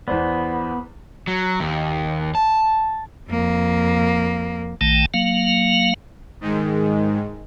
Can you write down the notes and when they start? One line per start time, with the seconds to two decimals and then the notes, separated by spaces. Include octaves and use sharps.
0.08 E2 B3 C5 D5
1.27 F#3
1.60 D#2
2.35 A5
3.29 F2 A#3
4.81 A#1 D#3 A3 G5 A5
5.14 F#3 A#3 F5
6.41 G#2 D#3 G#3